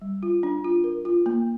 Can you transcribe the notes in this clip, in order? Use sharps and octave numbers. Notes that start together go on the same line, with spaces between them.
G3
F4
D4
F4
A#4
F4
A#3